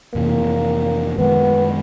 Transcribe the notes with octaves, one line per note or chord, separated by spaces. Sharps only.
F2 C3 E3 A#3
F#2 D#3 G#3 B3